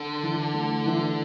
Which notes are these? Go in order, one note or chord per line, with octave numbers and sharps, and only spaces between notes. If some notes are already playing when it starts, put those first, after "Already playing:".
Already playing: D3
E3
A3
E3